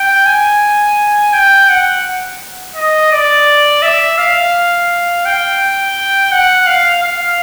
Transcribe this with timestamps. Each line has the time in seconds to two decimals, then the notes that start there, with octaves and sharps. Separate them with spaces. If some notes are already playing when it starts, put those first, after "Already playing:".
Already playing: G5
0.26 G#5
1.33 G5
1.69 F#5
2.76 D#5
3.12 D5
3.82 E5
4.18 F5
5.25 G5
6.32 F#5
6.67 F5
7.03 F5